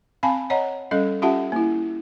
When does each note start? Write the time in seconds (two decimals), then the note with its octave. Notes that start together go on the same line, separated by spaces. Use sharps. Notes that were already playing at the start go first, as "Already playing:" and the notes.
0.23 C4 F5 G#5 A5 B5
0.50 C#5 D#5 F#5 A#5
0.91 G3 C#4 A4 D#5
1.22 C#4 F4 G4 E5 F#5 A5
1.52 A#3 E4